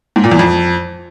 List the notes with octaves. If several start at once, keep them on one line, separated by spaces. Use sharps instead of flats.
G#2
A#2
E2
F2